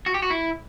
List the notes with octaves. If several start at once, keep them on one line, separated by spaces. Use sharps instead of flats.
F#4
G4
F#4
E4